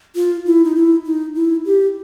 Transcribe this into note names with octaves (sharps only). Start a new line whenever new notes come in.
F4
E4
D#4
E4
D#4
E4
G4